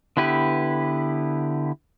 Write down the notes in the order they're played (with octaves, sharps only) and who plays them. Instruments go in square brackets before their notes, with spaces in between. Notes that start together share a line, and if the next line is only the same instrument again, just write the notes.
[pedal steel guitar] D3 B3 E4 G4 B4